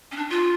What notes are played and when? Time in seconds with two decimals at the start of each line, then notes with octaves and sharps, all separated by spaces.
0.12 C#4
0.17 D4
0.30 F4